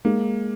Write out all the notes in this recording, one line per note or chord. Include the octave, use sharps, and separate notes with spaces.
G#3 A#3